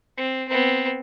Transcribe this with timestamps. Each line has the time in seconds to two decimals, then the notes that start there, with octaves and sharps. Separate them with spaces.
0.17 C4
0.48 B3 C4